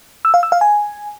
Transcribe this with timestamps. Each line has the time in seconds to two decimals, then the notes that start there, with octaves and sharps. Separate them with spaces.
0.25 E6
0.34 F5
0.43 E6
0.52 F5
0.61 G#5